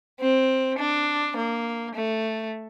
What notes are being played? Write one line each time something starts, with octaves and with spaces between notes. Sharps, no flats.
C4
D4
A#3
A3